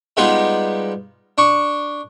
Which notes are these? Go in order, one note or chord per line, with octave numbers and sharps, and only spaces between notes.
G3 G#3 B3 D#4 F4
D4 C#6